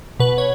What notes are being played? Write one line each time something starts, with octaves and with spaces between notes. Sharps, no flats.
B2 B4
C#5